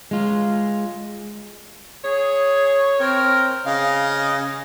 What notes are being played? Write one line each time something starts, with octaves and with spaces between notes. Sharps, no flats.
G#3 F4
G#4 C#5
C4 A#4
C#3 D#5 F5